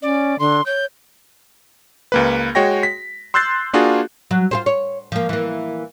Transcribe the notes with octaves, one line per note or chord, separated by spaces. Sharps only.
C#4 D5
D3 C6
C#5 G6
C#2 A#3 B4
G#3 F#4 C#5 G5 A#6
B6
C6 E6 F#6 G6 A6 C7
A#3 D4 F4 F#4 G#4
F#3
F4 G#4 C5
C#5
F3 A#3
E3 A#3